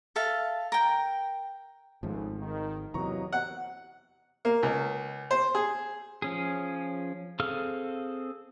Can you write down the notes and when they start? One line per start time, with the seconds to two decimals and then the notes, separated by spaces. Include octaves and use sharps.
0.16 A4 E5 F5 A5
0.72 A#4 G5
2.03 G#1 C#2 G#2 F3 A3
2.40 D#3
2.94 E2 C3 E3 F#3 A#3 D#5 A#5 C#6
3.32 F#5
4.45 A#3
4.63 C#2
5.31 C5
5.55 G#4
6.22 F3 C#4 G#4
7.40 C4 G#4 A4 F5 F6